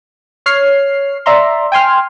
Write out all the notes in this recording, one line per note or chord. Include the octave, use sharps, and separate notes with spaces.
C#5 F6 C7
D5 E5 A#5 C6
G5 G#5 C6 F6